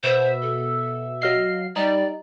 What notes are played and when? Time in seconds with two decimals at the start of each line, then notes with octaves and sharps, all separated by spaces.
0.03 B2 C5 E5
0.42 A4
1.22 F#3 D#5 F5 C7
1.76 G3 D#4 D5